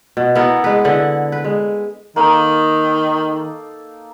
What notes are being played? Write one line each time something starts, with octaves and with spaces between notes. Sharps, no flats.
B2
B3 E4 A4 A#4
G#3 B4
D3 E4 B4 F#5
B4
G#3
D#3 A#3 D#4 A4